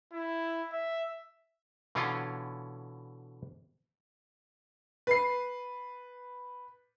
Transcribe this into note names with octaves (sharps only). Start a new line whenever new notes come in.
E4
E5
B2 D3 E3 C#4 F4
B4 C7